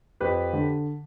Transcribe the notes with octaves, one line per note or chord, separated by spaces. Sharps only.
F2 G4 B4
D3